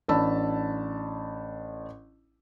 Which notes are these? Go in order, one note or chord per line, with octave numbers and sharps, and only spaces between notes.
A1 D4 A5 B5 E6